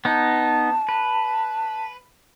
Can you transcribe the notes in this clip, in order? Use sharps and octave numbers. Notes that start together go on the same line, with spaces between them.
B3 D#4 A5
B4